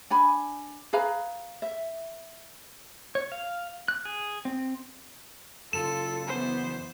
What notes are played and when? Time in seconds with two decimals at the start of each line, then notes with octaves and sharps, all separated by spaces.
0.10 D4 G#5 B5
0.93 G#4 B4 F5 A#5
1.62 E5
3.15 C#5
3.32 F5
3.88 F#6
4.05 G#4
4.45 C4
5.73 F#2 C#3 F4 A4 E7
6.27 E3 B3 C5